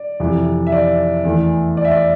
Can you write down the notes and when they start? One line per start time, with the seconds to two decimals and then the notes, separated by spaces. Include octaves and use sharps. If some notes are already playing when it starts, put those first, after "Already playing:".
Already playing: D5
0.20 F2 C3 E3
0.67 E5
0.72 D5
1.24 E2 E3 A3
1.77 D5
1.85 E5
1.91 D5